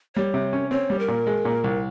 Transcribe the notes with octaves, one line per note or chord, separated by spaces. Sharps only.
G3 C#5
C3
C#4
C4 C#5
G3
A#4
A#2
G#3
A#2
C2